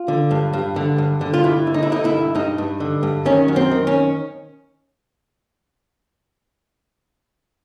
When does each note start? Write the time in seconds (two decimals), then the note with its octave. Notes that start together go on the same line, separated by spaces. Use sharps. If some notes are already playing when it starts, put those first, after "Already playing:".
Already playing: F4
0.08 D3
0.31 G2
0.53 G2
0.76 D3
0.98 G2
1.21 D3
1.34 F4
1.44 G2 E4
1.67 D3
1.74 D#4
1.83 E4
1.90 D3 D#4
2.05 E4
2.12 G2
2.35 G2 D#4
2.58 G2
2.80 D3
3.03 G2
3.25 D#3 C#4
3.48 F#2
3.56 C4
3.71 D#3
3.87 C#4